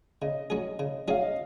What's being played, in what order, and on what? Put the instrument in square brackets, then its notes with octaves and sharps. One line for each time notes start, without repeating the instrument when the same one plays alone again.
[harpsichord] C#3 [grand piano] D#5
[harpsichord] F#3 C#4 G#4
C#3
[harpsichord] F#3 C#4 G#4 [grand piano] F5
[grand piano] D#5